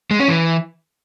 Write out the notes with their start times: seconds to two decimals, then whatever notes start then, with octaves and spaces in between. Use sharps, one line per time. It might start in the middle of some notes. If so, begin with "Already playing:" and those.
0.11 G#3
0.19 C#4
0.28 E3